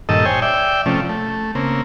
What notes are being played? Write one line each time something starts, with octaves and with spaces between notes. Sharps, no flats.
G2 A#2 D#3 A4 D#5 E6
C5 C#5 G5 G#5
D5 E5 G5
C3 F3 A3 C#4
A3
C#3 A#3 C4